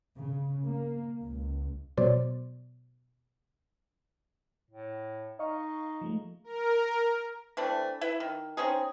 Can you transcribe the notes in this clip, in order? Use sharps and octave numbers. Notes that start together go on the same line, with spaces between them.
C#3
A#3
C#2
B2 F#3 C5 D5
A2
D#4 D#5 F5 C#6
F3 G#3 A3
A#4
E3 A3 C4 D4
E4 B4 E5
D#3
C4 C#4 D#4 G#4